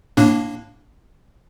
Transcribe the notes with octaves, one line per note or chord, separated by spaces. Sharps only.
A2 A#3 D4